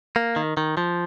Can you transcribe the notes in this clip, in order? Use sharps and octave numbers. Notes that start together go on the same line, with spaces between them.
A#3
D#3
D#3
F3